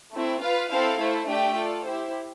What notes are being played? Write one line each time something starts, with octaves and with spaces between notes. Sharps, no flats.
A3 C4 E4
F4 B4 F5
C4 E4 A4 C5 F5
A3 E4 A4 C5
A3 D4 G4 D5 G5
F4 A4 D5
E4 G4 C5